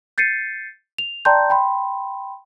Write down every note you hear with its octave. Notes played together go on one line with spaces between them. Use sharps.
G6 A6 C7 C#7 D#7
F7
D5 G5 A5 A#5 C6 G6
G5 B5 C6